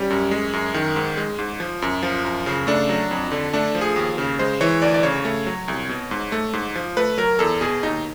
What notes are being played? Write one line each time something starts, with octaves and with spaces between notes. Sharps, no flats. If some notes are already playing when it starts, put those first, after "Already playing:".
Already playing: G3 C#4
F#2
G#3
F#2
D#3
G#2
G#3
G#2
F3
F#2
F3
F#2
C#3
A3 D4
F#3
F2
D3
A3 D4
F3
G#4
D#2
C#3
G#3 C5
E3 C#5
D2 D5
D5
C#3 C#5
A3
F#3
C2
B2
G#2
A3
G#2
F3
A3 B4
F#3 A#4
E2 A4
B2 G#4
D#2 D#4